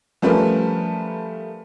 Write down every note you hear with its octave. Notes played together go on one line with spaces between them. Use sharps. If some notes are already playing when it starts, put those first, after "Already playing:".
F3 G3 A3 C#4 A#4 B4